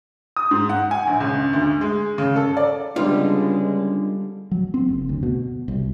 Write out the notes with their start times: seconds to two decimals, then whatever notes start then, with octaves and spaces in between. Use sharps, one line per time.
0.36 D#6
0.51 G#2
0.69 F#5
0.91 G#5
1.07 A#1
1.20 C#2
1.53 D2
1.81 G#3
2.18 C#3
2.36 A4
2.57 D5
2.96 C#2 D3 G3 G#3 B3 D4 F4
4.51 F#3
4.74 C4
4.89 F#1
5.09 D2
5.23 B2
5.68 C2